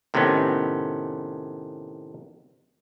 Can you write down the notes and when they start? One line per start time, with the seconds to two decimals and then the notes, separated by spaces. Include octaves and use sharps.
0.14 A2 C3 D#3 B3 C#4